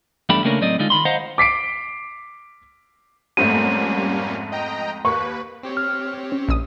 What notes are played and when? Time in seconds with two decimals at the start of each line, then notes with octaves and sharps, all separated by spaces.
0.29 E2 G2 A3 D4 G4 B5
0.44 C#3 A3 A#3 C#4 D4 A#4
0.61 A2 F#3 C4 D5 D#5
0.79 D3 G#3 D#4 F4
0.90 D#3 B5 C6
1.05 C5 D#5 F5 F#5 A#5
1.38 D6 B6 C7 D7
3.37 F2 G#2 G3 A3 A#3 C#4 D#7
4.52 D#5 G5 A#5
5.05 D#2 A#3 B4 C#6
5.63 C4 G4 C#5
5.77 F6
6.32 C#4
6.49 A#1 D#6